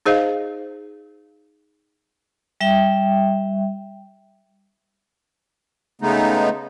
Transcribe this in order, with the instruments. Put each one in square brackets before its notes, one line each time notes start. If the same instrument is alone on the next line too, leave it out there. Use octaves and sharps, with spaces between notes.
[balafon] D#4 G#4 C5 D#5 F5
[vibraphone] G3 E5 G5
[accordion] C#3 G#3 A3 B3 D#4